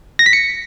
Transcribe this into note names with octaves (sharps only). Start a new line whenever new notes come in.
A#6
B6
C#7